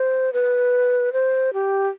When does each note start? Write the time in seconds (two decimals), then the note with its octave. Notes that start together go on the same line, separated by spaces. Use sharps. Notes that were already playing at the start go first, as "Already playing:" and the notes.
Already playing: C5
0.33 B4
1.13 C5
1.53 G4